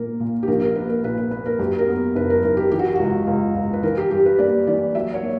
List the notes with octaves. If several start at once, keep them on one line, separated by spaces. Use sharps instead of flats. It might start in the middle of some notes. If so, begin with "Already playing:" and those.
Already playing: A#2 A#3 A#4
A#2
G4
A#1 A#4
A#4
A#3 B4
A#4
A#2 B4
B4
A#3 B4
A#4
F#2 G4
A#4
B3
F#1 B4
A#4
F#1 A#4
G4
E3 G4
F#4
C#2 F#4
C#2
C#2
B4
E3 A#4
G4
G2 G4
B4
A#3 D5
E3 D5
F#3 E5
C#5
A#3